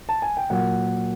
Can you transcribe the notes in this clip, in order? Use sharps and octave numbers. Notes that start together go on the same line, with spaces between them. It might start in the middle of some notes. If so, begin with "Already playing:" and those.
A5
G#5
G5
A#2 F#3 A#3 F#5